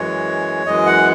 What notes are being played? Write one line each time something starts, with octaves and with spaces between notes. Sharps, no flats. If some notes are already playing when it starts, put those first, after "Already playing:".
Already playing: F#2 E3 G#3 C#5
F#2 E3 G#3 D#5
F#5